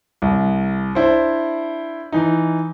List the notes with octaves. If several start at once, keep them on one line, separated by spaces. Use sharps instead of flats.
C2
D4 E4 C5
E3 D#4